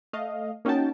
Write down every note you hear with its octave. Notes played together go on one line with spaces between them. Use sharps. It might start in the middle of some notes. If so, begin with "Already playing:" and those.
A3 D#5 F5
A#3 C#4 D#4 F#4 G5 A5